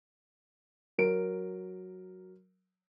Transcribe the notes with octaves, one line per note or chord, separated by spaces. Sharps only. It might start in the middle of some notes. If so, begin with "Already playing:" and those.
F#3 A#4 D7